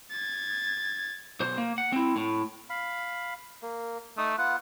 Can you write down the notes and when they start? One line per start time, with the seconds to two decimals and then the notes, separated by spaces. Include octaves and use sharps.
0.11 G#6 A6
1.40 B1 C5
1.58 A#3
1.78 F#5
1.92 C4 E4
2.16 A2
2.70 F5 B5
3.62 A#3
4.18 A3 D#4 D#6
4.38 B3 F4 F#5